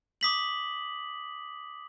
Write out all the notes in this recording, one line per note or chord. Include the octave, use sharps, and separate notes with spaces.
D6 D#6 B6 F#7